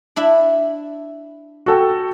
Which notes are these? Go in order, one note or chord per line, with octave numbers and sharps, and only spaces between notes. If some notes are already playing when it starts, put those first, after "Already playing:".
D4 E4 E5
F#4 A4 G5